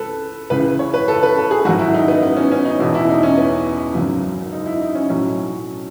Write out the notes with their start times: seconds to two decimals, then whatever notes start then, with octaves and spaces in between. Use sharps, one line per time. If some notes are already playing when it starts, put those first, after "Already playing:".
Already playing: C#2 E3 A4 B4
0.50 C#2 C#3 E3 B4
0.79 C#5
0.94 B4
1.08 A4
1.23 B4
1.37 A4
1.51 G#4
1.65 G#1 G#2 D#3 F#3 F#4
1.79 E4
1.94 D#4
2.08 B3
2.23 B3
2.37 C#4
2.52 C#4
2.65 D#4
2.80 E1 E2 B2 D#4
2.95 E4
3.09 D#4
3.23 C#4
3.38 B3
3.94 G#1 F#2 C#3 F#3
4.53 D#4
4.66 E4
4.81 D#4
4.95 C#4
5.09 B1 A2 F#3 C#4